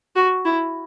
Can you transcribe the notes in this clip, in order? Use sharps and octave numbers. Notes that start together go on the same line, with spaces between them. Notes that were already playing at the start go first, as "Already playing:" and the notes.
F#4
E4